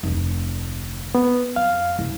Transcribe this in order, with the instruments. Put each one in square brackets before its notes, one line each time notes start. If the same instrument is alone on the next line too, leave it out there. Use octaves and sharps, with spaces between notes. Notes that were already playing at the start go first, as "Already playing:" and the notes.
[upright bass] F1 D2
[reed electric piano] B3
[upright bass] F2 [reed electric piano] F5
[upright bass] F#1 C2